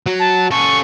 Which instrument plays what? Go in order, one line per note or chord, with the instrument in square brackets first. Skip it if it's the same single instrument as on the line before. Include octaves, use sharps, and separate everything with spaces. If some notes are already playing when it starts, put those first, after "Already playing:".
[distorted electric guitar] F#3
[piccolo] A5
[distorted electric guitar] C#4 A4 [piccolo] C#6